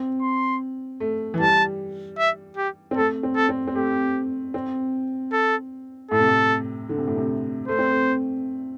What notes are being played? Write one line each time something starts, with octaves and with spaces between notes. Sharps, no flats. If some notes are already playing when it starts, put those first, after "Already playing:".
Already playing: C4
C6
A3
E3
G3 A5
E5
G4
C4
A3 A4
C4
A4
C4
C4
A3 G4
C4
A4
A2 A4
C3
A2
D3
C3
A2
C3
A3 C5
C4
A3